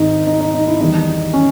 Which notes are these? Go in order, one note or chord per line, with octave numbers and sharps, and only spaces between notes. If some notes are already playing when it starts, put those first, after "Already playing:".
Already playing: G#1 G#2 D#3 D#4
D#4
D#4
D#4
E4
E2 D#3 G3 D#4
C#4